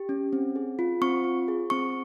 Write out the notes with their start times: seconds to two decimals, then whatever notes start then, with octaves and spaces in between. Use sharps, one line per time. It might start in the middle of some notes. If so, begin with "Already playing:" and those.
Already playing: G4
0.09 C#4
0.33 C4
0.56 G#4
0.79 F4
1.02 C4 C#6
1.24 F4
1.48 G#4
1.70 C4 C#6